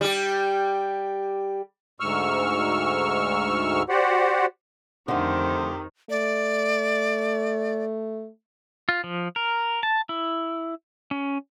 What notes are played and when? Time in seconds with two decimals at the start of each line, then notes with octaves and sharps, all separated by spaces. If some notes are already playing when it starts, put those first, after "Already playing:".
0.01 G3 G4
2.00 D2 G#2 C#6 E6 F6
3.89 F#4 G4 C5 D5 F#5
5.08 F2 D3 D#3 A3 G4 C5 D#6
6.10 A3 D5
8.89 F4
9.04 F3
9.36 A#4
9.83 A5
10.09 E4
11.11 C#4